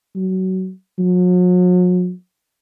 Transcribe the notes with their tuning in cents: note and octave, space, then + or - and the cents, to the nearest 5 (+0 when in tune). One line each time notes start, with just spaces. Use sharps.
F#3 +20
F#3 -40